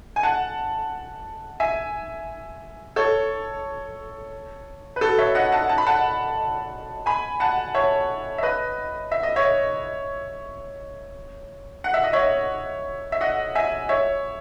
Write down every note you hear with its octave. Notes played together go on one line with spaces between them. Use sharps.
G#5
F#5 A5
E5 G#5
A4 C#5
B4
F#4 A4
C#5 E5
D#5 F#5
F#5 A5
A5
B5
F#5 A5
G#5 B5
F#5 A5
C#5 E5
E5
B4 D#5
E5
D#5
C#5 E5
F#5
E5
D#5
C#5 E5
E5
D#5 F#5
E5 G#5
C#5 E5